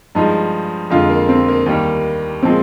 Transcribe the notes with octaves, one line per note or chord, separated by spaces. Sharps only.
G2 F3 G#3 D#4
F2 D3 G#3 F4
A#3
C4
A#3
D#2 D#3 G3 A#3
A#2 F3 G#3 C4